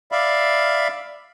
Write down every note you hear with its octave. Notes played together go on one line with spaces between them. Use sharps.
D5 E5 F5 B5